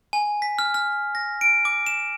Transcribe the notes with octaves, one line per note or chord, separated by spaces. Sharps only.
G#5
B6
F6
F6
A#6
D7
D6
E7